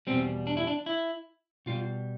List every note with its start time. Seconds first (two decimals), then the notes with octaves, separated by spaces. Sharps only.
0.07 E2 B2 G3 C4
0.47 D4
0.57 E4
0.67 D4
0.86 E4
1.66 B2 G3 F4